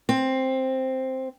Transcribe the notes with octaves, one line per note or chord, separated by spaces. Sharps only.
C4